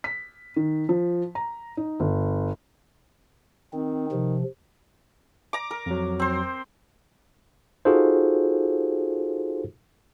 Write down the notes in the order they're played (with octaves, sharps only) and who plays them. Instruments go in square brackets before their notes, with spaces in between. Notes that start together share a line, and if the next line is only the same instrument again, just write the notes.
[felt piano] B6
D#3
F3
A#5
D#4
G1
[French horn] D#3 [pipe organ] C4
[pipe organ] C3 F3
[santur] A#5 D6
A#4
[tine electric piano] F2 F#3
[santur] C4 C5
[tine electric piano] D#4 F4 F#4 G#4 A4 C5